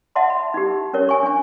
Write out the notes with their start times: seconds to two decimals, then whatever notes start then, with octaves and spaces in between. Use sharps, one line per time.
0.15 D#5 E5 F#5 A5 C6
0.30 B5
0.54 D#4 G4
0.93 C#4 A#4 C#5
1.09 G#5 C#6
1.23 D4 G#5